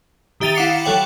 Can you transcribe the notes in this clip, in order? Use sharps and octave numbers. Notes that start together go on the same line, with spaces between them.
D#3 G4 E5 A6 D#7 F7
E4 F5 F#5 D6 C7 C#7
F#3 A4 C#5 G5 F#7